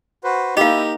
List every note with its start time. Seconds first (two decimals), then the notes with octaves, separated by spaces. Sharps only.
0.24 F#4 B4 C5
0.57 A#3 D#4 E4 G4 D#5 F5